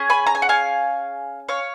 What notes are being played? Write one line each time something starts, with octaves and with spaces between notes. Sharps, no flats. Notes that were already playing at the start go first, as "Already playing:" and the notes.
Already playing: C#4 G#4
G#5 B5
A#5
G#5
F#5
F5 G#5
C#5 F5